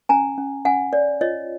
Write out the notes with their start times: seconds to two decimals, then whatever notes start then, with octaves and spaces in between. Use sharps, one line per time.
0.09 C#4 G#5 A#5
0.38 C#4
0.65 C#4 F#5 G#5
0.93 C#5 D5
1.21 F4 C#5 D#5